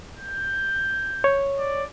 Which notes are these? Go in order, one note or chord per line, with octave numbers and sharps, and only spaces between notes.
G6
C#5
D5